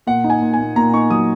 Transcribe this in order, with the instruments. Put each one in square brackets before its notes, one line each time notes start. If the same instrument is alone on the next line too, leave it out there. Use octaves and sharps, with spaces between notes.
[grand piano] A#2 F#5
D#4
G#5
A#2
G#5
A#2
A#2 A#5
D#4 C#6
F#3 D#6